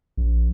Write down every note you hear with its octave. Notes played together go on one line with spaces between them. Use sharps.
A#1